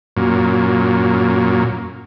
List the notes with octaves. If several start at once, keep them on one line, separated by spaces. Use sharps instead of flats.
F#2 A#2